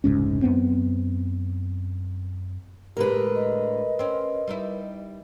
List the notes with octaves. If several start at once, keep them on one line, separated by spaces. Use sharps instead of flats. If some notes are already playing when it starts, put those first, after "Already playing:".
F1 C#2 G#2 C#4
F#2 B3 C4
A2 D3 G#3 G4 A#4 B4
D#5
C4 C#4
G3 D#4 E4